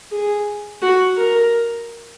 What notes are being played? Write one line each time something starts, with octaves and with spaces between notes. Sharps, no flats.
G#4
F#4
A#4